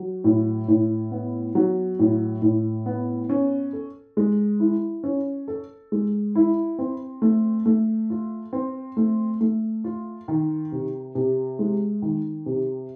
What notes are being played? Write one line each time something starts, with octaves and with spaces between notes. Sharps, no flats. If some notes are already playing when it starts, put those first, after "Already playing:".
Already playing: F#3
A2
A2
B3
F#3
A2
A2
B3
C#4
A4
G#3
E4
C#4
A4
G#3
E4
C4
A3
A3
F4
C4
A3
A3
F4
D#3
C3
C3
G#3
D#3
C3